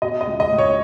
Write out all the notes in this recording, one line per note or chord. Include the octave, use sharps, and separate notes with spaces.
B2 D#5
D#5
C#2
D#5
C#2
C#5